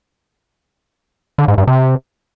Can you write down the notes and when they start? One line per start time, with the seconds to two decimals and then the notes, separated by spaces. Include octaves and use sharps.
1.38 D3
1.48 G#2
1.58 G2
1.67 C3